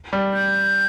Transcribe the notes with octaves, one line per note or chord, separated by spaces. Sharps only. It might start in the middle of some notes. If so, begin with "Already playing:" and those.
G3
G6